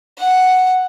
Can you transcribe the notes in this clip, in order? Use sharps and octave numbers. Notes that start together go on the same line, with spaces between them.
F#5